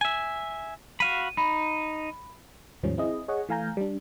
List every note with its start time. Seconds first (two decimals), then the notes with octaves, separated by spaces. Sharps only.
0.01 E5 G#5
1.00 F#4 F5 B5 D#7
1.37 D#4 B5
2.83 D#2 G#2 D#3 F3 G3 C#4
2.97 C4 E4 G#4 D#5
3.28 G#4 C#5 D#5 F#5
3.49 E3 A3 F5 G#5 A#5 G6
3.77 G3 D4